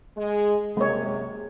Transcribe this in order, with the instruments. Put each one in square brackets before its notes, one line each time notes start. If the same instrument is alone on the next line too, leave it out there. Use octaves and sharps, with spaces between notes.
[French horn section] G#3
[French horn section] F#2 C3 [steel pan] G#3 A#3 C#5